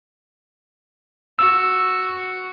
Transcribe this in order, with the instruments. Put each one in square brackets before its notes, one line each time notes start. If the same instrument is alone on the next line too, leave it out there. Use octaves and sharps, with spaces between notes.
[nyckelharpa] F#4 [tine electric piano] E6